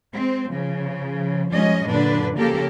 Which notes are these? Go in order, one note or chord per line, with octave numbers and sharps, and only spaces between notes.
G#3 C4
C#3 F3
F3 G3 G#3 C#4 D#5
F#2 A#2 D3 D4 B4
C#3 F3 A#3 G4 A4 A#4